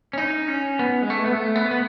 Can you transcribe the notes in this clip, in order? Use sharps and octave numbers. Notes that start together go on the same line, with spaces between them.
C#4
D#4
C#4
B3
G#3
A3
B3
A3
B3
B3